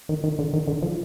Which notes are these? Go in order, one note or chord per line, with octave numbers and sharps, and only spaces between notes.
D#3
D#3
D3
D#3
D3
F3